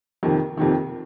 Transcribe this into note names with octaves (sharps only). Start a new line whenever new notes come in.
F2 C3 D#3
F2 C3 D#3